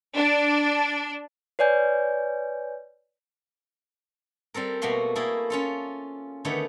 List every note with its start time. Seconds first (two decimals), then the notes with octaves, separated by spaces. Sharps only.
0.15 D4
1.59 B4 C#5 D5 G#5 G6
4.54 G3 C4 A4 A#4
4.82 B2 A3 A#3 F#4 C6
5.15 A3 A#3 E4 G#4 A4
5.50 C#4 F4 A4
6.45 D3 D#3 A3 B3 G4 C#5